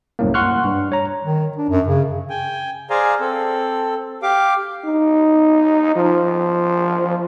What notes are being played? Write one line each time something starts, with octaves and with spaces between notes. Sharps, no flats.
C2 F#2 A2 A#3
F#5 C6 C#6 F6 F#6
G2
C#5 A#5
D#3
D4
F#2
C#3
G5 G#5
G#4 C5 D5 F5 G#5 A#5
C4 A4
G4 F5 D6
D#4
F3